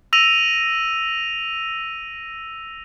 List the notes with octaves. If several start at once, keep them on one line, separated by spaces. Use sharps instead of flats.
E6 A#6 D#7 F7